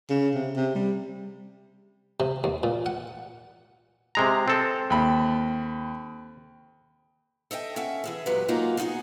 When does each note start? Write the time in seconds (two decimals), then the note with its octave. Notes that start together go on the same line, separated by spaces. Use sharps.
0.10 C#3
0.35 C3
0.57 C3
0.75 G3
2.20 C3
2.44 D#2
2.63 A#2
2.86 F#5
4.15 C3 G#3 A#5
4.48 C4 A4
4.90 D#2 B5
7.51 A4 D#5 E5 G5
7.76 C#4 A4 E5 F#5
8.04 E3 G#4 A4
8.26 E2 A#2 F#3 G#3 G4 B4
8.48 F#3 G#3 A#3 D#4 F4 F#4
8.77 G3 B3 D#4 F#4 G#4